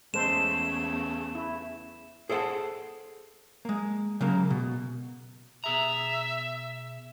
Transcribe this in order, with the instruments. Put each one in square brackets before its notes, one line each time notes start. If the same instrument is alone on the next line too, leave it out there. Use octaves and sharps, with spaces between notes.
[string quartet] E2 C#3 A3 [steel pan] G#3 A4 C5 [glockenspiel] E7
[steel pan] E4
[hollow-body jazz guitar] G#4 A4 C5 D5 F#5 A5
G#3 A#3
C#3 F#3 A#3
B2
[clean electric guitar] B2 G#4 A#5 [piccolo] E5